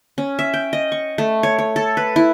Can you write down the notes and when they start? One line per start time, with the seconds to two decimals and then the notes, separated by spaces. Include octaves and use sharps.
0.18 C#4
0.39 E5
0.54 G5
0.73 D#5
0.92 C#6
1.18 A3
1.43 C#5
1.58 C#5
1.76 A4
1.97 B4
2.16 E4